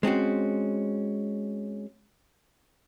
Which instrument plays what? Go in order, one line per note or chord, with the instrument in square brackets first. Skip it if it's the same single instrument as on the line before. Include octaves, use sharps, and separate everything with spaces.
[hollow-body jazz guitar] G#3 C4 C#4 F#4